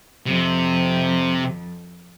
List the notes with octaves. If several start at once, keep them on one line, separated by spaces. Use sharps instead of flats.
F2 C3